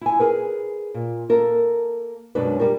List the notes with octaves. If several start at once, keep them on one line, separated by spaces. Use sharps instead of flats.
E4 G#5
G#4 A#4 B4
A#2
A#3 A4 A#4
F#2 B2 F#3 G#3 D4 B4
G3 G4 A#4